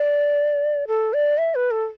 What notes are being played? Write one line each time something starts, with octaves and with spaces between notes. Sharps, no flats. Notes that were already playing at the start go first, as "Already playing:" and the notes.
Already playing: D5
A4
D5
E5
B4
A4